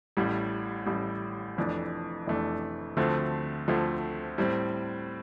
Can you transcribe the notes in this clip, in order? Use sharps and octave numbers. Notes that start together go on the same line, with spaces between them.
A1 A2 G3
A1 A2 G3
F1 F2 E3 A3 D4
F1 F2 E3 A3 D4
D2 D3 F3 A3 C4
D2 D3 F3 A3 C4
A2 G3 C4